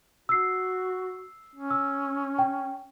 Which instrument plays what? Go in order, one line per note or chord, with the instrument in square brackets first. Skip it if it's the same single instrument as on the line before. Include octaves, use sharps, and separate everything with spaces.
[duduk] F#4 [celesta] E6 C7
[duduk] C#4
[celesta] E6
G5